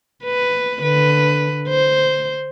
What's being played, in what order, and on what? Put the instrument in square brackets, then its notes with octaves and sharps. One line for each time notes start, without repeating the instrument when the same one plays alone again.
[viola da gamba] B4
D3 B4
C5